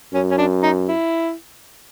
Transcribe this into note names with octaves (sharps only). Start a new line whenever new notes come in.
F#2 C#4
C#4
D4
D#4
E4